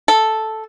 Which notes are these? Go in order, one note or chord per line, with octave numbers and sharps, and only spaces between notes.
A4